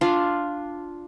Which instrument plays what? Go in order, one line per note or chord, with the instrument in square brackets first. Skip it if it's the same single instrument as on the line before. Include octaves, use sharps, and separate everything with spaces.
[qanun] D4 F4